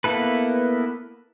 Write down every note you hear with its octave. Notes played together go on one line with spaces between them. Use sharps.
A#3 B3 E4 A4 B4